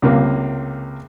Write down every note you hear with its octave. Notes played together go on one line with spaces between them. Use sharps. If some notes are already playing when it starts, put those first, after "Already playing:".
C#2 C3 A#3 F5